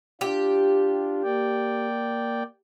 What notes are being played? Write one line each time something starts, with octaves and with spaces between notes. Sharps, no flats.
D4 F4 G4
A#3 D5 G5